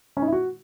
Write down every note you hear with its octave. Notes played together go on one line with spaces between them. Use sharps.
C#4
D#4
E4
F#4